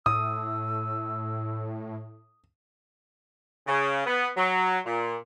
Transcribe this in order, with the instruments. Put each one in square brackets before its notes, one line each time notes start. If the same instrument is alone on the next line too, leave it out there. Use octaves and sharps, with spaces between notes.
[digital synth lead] A2 [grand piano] D#6 [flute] E6
[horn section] C#3
B3
F#3
A#2